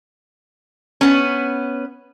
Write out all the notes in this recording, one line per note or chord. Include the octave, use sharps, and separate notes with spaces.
B3 C#4